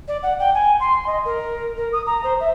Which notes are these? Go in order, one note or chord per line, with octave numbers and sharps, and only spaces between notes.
D5
F#5
G5
G#5
C6
D#5
A#4
A#4
D#6
A#5
C5
E5